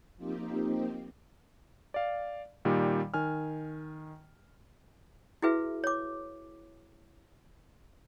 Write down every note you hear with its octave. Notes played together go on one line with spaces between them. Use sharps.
F3 A#3 C4 D#4 G4
D5 F5
A#2 D#3 G3
D#3 G#5 F6
E4 F#4 G#4 B4 E5
C#5 D6